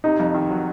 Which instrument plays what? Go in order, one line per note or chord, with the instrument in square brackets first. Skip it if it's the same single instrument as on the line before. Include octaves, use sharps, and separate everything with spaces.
[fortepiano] C3 [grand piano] D#4
[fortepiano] F2
D#3
F#3